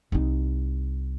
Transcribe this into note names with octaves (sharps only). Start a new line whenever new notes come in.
C2 D#4